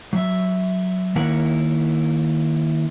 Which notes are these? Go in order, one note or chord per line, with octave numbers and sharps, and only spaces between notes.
F#3 E5
D#3 A#3 C#4 E4 A#4 F#5